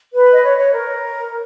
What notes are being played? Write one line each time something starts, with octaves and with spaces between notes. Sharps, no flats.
B4
D#5
C#5
C#5
A#4